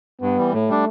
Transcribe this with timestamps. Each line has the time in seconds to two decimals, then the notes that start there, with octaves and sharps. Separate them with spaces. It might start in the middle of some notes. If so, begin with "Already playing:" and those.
0.21 G2 B3
0.37 E3 G3
0.53 A2 A3
0.69 G3 D4